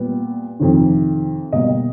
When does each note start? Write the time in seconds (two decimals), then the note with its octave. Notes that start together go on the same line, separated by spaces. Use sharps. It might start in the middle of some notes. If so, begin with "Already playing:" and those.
Already playing: A#2 G3 B3
0.60 F2 C3 D#3
1.52 B2 G3 A#3 D#5